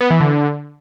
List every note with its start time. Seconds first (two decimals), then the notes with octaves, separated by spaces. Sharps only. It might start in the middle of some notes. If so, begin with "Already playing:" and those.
0.01 B3
0.10 E3
0.20 D3